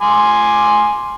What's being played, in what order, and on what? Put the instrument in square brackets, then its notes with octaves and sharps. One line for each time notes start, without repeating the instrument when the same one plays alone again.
[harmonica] G#5 C6 D6